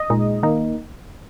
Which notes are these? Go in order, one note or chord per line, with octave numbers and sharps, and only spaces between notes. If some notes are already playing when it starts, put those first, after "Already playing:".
Already playing: D#5
A#2 G#3 D#4
D#3 A#3 D#4